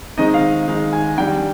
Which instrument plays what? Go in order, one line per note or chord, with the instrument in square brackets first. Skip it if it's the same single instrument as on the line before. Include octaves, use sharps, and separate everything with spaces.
[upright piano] D#3 G#3 C4 D#4 [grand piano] D#5
[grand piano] F5
[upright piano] D#3 G#3 D#4
[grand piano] G#5
[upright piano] D#3 G3 D4 [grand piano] G5